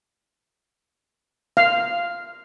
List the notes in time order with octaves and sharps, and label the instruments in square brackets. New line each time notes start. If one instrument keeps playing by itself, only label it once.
[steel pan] F5